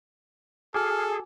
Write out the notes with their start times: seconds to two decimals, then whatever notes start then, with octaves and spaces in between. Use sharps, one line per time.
0.74 F#4 G#4 A4 G#5 D6 F6